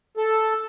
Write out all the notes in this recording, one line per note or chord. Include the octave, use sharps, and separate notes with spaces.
A4